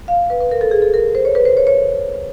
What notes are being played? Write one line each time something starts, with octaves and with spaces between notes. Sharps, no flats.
F5
B4
B4
A#4
A4
G#4
A4
A#4
C5
C#5
B4
C5
C#5
C#5